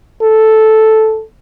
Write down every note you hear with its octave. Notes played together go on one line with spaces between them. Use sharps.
A4